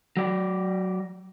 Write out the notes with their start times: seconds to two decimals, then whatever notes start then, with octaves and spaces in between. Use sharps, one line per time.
0.17 F#3 D5